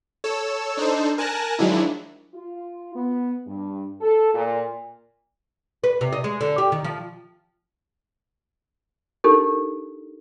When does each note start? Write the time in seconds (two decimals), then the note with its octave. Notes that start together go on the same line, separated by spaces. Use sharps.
0.24 A4 C#5 E6
0.77 D4 D#4 A4 C5
1.18 A#4 G#5 A5 F#6 A#6
1.59 D#3 F3 F#3 G#3 D4 E4
2.34 F4
2.95 B3
3.47 G2
4.01 A4
4.34 A#2
5.84 B4
6.01 C3
6.12 D#5
6.24 G#3
6.41 D3
6.58 G4
6.72 D#3
6.84 F3
9.24 D4 D#4 G4 A4 A#4